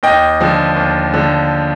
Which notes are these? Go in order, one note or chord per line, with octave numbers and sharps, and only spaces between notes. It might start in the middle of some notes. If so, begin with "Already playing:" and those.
D#2 D#5 G5
D3 F3
D#2
D3 F3